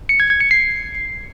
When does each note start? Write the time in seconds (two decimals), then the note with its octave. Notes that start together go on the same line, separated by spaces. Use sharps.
0.09 C#7
0.20 G#6
0.30 G#6
0.40 C#7
0.51 C7